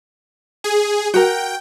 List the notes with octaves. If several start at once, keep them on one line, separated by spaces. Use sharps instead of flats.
G#4
F#4 A#4 G5